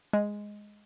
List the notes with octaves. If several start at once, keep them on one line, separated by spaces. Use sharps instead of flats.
G#3